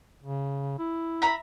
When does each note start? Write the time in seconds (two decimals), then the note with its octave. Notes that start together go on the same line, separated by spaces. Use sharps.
0.22 C#3
0.79 E4
1.22 E5 A#5 B5